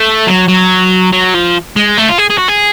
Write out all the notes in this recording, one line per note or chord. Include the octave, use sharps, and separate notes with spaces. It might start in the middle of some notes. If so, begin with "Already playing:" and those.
Already playing: A3
F#3
F#3
F#3
F3
G#3
A3
F4
G#4
G#4
F#4
G#4